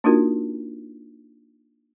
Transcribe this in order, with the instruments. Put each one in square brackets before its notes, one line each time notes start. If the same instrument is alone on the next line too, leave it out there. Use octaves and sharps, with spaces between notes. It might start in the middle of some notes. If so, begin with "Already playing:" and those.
[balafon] A#3 D4 D#4 F4 F#4 A#4